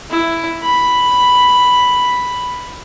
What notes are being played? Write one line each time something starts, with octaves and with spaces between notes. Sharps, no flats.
E4
B5